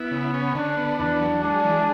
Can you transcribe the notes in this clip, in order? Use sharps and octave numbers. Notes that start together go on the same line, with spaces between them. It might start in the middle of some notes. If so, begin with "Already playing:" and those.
Already playing: B3 E4
C#3
C#4
D3 D4
B3
E2 D4
F#3
G#3 D4
E3